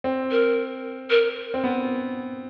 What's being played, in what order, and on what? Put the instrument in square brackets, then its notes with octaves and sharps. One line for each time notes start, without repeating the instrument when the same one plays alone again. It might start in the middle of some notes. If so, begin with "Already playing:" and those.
[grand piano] C4
[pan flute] A#4
A#4
[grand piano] C4
B3